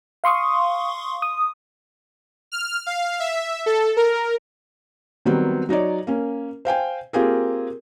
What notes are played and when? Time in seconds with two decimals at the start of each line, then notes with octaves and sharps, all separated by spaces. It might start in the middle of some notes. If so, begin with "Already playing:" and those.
0.24 F5 C6 C#6 D#6
1.22 D#6
2.52 F6
2.86 F5
3.20 E5
3.66 A4
3.97 A#4
5.25 D#3 F#3 G3 B3 C4
5.69 F#3 D#4 C#5 D5
6.07 A#3 C#4
6.65 C5 F5 G5 G#5
7.13 A#3 C4 F4 G4 G#4 A#4